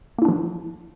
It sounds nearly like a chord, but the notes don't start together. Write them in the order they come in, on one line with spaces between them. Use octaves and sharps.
A#3 E4 D4 F3